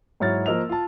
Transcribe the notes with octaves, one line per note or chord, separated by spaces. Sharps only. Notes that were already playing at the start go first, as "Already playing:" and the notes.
G#2 F#3 E4 C#5 F6 A6
F3 A#3 A#4 D#5 E6 F7
F4 A5